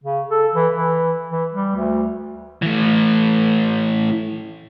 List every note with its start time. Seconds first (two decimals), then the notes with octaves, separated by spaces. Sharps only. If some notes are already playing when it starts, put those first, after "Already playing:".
0.04 C#3
0.31 A4
0.54 E3
0.73 E3
1.30 E3
1.53 G3
1.76 D2
2.62 A2 E3